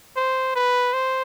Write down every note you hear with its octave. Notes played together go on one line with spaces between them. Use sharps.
C5
B4
C5